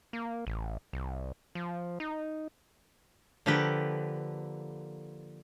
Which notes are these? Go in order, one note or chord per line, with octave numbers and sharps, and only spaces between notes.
A#3
A1
C2
F3
D#4
D3 F3 A#3 G4 A4 B4